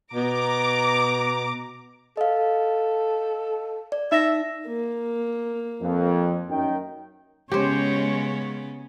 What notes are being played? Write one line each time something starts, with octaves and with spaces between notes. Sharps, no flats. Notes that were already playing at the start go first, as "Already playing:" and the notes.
B2 A#5 D6
A4 D#5 F5
D5
D#4 E5 A#6
A#3
F2
F#2 D#3 G5
C#3 G#3 B3 C#4 G4 C5 C#5